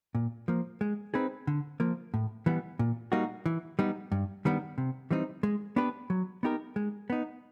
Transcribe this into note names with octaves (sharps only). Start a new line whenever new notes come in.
A#2
F3 A#3
G#3
C4 D#4 G#4 B4
D3
F3 A#3
A2
E3 G3 B3
A#2
G3 A#3 D#4 F#4
E3
G3 B3 D#4
G2
D#3 G3 B3 D4
C3
E3 G3 C4 D#4
G#3
B3 D4 G4 B4
F#3
B3 D#4 G4 A#4
G#3
B3 D#4